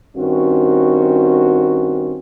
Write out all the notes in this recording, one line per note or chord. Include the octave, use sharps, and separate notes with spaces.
G2 D#3 C4 C#4 F#4